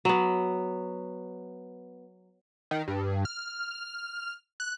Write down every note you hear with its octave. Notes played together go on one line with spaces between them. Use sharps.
F#3 B3
D#3
G2
F6
F#6